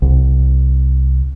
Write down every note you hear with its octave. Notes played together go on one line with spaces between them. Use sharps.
C2